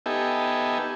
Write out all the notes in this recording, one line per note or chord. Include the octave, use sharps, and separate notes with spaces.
B3 D#4 G4 A4 E5 G#5